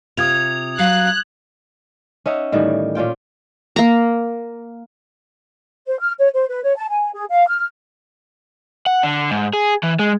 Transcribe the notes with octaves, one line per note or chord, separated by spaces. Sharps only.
C3 F4 D#6 G#6 F7
F#3 F5 F#6
C#4 D#4 E5 F#5
A2 D#3 E3 G3
A#2 C#4 F4 G5
A#3 A#5
C5
F6
C#5
C5
B4
C#5
A5
G#5
G#4
F5
F6
F#5
D3
G#2
G#4
E3
G#3